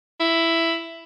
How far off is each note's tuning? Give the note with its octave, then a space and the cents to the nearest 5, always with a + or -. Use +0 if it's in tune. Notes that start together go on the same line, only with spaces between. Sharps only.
E4 +5